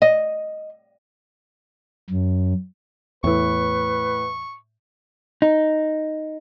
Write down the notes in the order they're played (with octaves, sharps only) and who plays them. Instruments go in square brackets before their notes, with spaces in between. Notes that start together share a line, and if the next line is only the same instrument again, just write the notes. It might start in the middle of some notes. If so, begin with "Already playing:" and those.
[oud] D#5
[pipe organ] F#2
[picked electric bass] E2 E3 [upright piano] A2 [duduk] B4 [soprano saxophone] C#6
[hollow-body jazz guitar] D#4